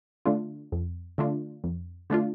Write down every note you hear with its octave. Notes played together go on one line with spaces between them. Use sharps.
D3 A3 D4 F4
F2
D3 A3 D4 F4
F2
D3 A3 D4 F4